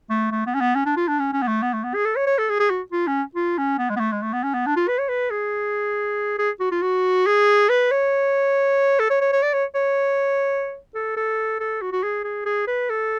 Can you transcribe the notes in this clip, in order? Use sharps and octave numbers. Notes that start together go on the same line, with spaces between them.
A3
A3
B3
C#4
B3
C#4
D4
F4
D4
C#4
C#4
B3
A3
B3
A3
B3
G#4
A4
C#5
C#5
A4
G#4
G#4
F#4
F4
C#4
F4
C#4
B3
G#3
B3
A3
G#3
A3
B3
C#4
B3
D4
F4
B4
C#5
B4
G#4
G#4
F#4
F4
F#4
G#4
B4
C#5
A4
C#5
C#5
C#5
D5
C#5
C#5
A4
A4
A4
F#4
F#4
G#4
G#4
G#4
B4
A4